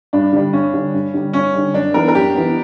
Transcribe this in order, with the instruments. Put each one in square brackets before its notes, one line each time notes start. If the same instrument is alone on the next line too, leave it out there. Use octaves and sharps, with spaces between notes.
[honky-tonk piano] G2 [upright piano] D4
[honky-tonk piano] D3 G3
[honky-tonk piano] G2 [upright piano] C#4
[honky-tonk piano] D3 G3
G2
D3 G3
[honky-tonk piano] G2 [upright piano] C#4
[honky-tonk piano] D3 G3
[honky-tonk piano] F#2 [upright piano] D4
[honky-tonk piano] E3 B3 [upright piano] A#4
[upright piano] A#4
[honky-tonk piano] F#2 [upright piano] G4
[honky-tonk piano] E3 B3